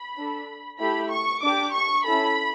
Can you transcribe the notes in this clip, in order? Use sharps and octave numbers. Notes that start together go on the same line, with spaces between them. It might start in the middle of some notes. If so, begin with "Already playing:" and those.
Already playing: B5
D4 A4
A3 E4 G4 B5
C#6
D4 G4 D6
C#6
C#4 E4 A4 B5